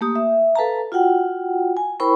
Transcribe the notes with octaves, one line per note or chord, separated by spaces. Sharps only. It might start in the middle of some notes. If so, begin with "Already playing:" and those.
A3 A#3 G4 D#6
E5
A4 B4 F5 A5 A#5
F4 F#4 F#5 G5
G#5
E4 A#4 C5 G5 B5 C#6